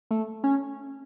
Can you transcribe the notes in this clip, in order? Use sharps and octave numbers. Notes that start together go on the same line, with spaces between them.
A3
C#4